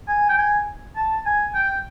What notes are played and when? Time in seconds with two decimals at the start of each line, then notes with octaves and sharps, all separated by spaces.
0.08 G#5
0.29 G5
0.38 G#5
0.96 A5
1.26 G#5
1.55 G5